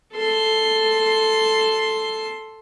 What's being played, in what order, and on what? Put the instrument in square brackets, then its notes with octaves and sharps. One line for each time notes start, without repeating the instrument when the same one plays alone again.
[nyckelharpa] A4 C6